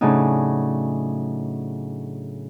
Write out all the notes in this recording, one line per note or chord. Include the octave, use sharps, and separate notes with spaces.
A2 C#3 F#3 D4 D#4